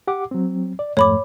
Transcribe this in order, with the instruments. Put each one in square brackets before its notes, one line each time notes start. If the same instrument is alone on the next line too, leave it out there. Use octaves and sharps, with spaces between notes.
[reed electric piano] G4 F#5 D6
F#3 C4
D5
[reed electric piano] F2 G#2 A3 [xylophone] C#5 B5 D6